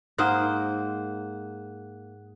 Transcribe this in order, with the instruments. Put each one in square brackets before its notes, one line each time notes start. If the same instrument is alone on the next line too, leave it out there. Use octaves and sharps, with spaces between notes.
[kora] G#2 A#3 C5 [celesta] F#5 D#6 F#6